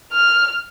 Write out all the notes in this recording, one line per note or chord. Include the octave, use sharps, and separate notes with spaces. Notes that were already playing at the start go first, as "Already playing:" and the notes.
F6